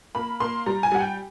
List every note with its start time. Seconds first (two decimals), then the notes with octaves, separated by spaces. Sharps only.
0.15 A#3 B5
0.40 A#3 C6
0.66 G3 A#5
0.83 G#5
0.92 G3 F#5
1.00 G5